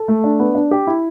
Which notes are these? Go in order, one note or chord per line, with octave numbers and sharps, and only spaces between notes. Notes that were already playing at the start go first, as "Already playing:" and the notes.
Already playing: A4
A3
D4
B3
D4
G4
E4